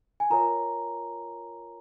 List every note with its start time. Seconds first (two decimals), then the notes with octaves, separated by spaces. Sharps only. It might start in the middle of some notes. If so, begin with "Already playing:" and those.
0.20 G#5
0.30 F4 A#4 C#5 A#5